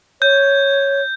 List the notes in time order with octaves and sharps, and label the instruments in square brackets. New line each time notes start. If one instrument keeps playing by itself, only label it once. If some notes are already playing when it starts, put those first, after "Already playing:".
[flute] C#5 [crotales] G6